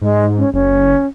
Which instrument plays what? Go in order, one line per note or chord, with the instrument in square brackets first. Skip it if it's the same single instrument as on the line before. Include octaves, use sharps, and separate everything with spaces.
[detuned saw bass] G#2 [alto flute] G#3
[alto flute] C#4
[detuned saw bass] F#1 [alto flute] C#4